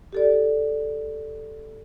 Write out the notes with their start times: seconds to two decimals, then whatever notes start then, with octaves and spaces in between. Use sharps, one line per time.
0.13 G4 A4 D5